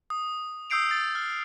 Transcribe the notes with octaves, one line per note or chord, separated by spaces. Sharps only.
D#6
D#6 E6 G6 C7 D7 F7
A6
F6